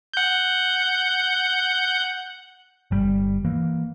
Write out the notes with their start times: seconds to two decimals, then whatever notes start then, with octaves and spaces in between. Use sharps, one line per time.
0.14 F#5 G6
2.91 G1 G3
3.45 E3 A#3